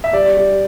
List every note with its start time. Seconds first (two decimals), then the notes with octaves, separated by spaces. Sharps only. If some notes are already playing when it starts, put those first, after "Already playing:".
0.04 E5
0.13 G3 D5
0.37 G3